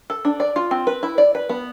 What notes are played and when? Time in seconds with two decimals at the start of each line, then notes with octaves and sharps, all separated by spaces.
0.10 A4
0.25 D4
0.40 D5
0.56 F4
0.71 C4
0.87 B4
1.03 E4
1.18 D5
1.35 B4
1.49 B3